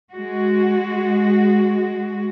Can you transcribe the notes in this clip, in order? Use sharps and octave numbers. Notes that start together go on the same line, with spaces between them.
G#3 F#4